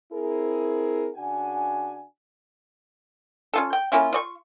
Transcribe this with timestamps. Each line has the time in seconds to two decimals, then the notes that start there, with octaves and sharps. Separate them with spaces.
0.13 C4 E4 G#4 A#4
1.15 C#3 D4 F#4 F#5 G#5
3.54 C#4 F4 A4
3.73 G5
3.92 A#3 C#4 E4 F4
4.13 F4 D5 C#6